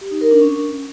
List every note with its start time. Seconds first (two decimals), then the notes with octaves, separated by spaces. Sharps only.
0.01 G4
0.11 D#4
0.21 A#4
0.31 D4
0.41 C#4